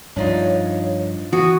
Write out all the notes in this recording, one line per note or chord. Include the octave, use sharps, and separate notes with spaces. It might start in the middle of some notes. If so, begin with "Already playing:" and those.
G2 F3 D4 D#4 F4 C#5
E3 F#4 D#6